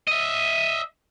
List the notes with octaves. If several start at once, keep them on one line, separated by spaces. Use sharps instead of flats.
D#5 E5